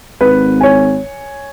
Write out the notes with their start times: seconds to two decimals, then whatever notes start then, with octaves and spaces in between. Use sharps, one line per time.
0.21 G#1 B4
0.61 C#5 G#5